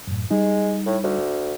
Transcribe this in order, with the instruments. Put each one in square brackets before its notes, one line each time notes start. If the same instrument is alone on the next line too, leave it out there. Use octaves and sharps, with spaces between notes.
[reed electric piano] F#2 A2
[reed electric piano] G3 D#4 [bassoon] G#3
[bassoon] A2
D2